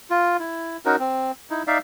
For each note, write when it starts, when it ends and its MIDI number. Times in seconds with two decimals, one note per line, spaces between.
0.10 0.37 65
0.40 0.77 64
0.85 0.96 61
0.85 0.96 63
0.85 0.96 66
0.85 0.96 70
0.99 1.32 60
1.50 1.63 63
1.50 1.63 64
1.67 1.78 63
1.67 1.78 74
1.67 1.78 76
1.67 1.78 77